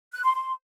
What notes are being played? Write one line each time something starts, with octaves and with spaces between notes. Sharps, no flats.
F#6
C6
C6